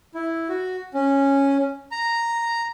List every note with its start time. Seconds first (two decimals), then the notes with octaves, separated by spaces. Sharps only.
0.15 E4
0.49 F#4
0.94 C#4
1.91 A#5